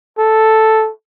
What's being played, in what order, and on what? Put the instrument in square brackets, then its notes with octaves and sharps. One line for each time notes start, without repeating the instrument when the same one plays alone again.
[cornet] A4